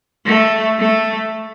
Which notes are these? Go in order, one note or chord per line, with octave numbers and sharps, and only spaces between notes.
A3
A3